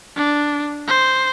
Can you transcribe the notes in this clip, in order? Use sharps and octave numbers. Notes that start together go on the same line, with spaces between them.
D4
C5